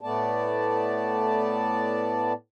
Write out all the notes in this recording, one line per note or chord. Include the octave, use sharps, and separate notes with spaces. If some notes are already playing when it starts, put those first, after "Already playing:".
A2 A3 B3 D5 A5